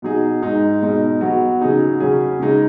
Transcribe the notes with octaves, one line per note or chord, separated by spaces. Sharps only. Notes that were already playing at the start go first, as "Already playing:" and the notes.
B2 F#3 D#4 G#4
G#2 G#3 D#4
B2 G#3 D#4
F#3 B3 F#4
C#3 F#3 D#4 G#4
C#3 F#3 C#4 G#4
C#3 G#3 D#4 G#4